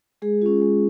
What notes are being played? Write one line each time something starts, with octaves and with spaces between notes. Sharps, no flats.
G#3 G#4
C#4 F4
G#3